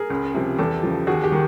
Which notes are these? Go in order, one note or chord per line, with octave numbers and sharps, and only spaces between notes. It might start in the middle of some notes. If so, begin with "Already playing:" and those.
Already playing: G#4 A#4
C#2
C3 F3
E2 G4 A4
C#3 F3
D#2 F#4 G#4
G4
D#3